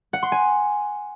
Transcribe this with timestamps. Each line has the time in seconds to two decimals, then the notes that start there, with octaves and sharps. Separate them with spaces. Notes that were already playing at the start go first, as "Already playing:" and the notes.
0.13 F#5
0.23 C6
0.32 G#5